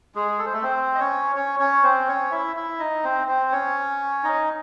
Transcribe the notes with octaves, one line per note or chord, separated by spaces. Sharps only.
G#3 G#4
A4
C5
A3 A4
C4 C5
D#5
C#4 C#5
C#4 C#5
C#4 C#5
C4 C5
C#4 C#5
E4 E5
E4 E5
D#4 D#5
C4 C5
C4 C5
C#4 C#5
D#4 D#5